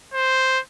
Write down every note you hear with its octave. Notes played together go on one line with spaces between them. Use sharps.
C5